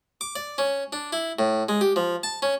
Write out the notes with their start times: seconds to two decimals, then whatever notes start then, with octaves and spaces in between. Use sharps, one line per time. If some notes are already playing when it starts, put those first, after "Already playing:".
0.21 D6
0.36 D5
0.58 C#4
0.93 D4
1.13 E4
1.39 A2
1.69 G#3
1.81 G4
1.96 F3
2.23 A5
2.42 C#4